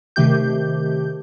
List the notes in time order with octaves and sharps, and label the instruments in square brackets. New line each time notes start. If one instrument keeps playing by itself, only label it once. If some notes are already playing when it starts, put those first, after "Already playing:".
[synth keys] C3 D#3 A3 G4 G6